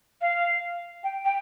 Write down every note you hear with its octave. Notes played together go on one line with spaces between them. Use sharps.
F5
G5
G5